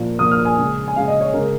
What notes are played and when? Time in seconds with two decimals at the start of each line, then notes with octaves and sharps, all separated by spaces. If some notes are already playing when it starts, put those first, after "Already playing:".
Already playing: A#2 F3 A#3
0.19 A#2 F3 A#3 D#6
0.31 F6
0.45 G#5
0.58 C#3 G#3
0.88 G#5
0.96 C#3 G#3 F5
1.08 D#5
1.21 C#5
1.34 C#3 G#3 A#4